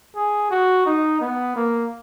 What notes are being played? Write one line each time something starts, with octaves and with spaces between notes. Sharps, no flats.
G#4
F#4
D#4
B3
A#3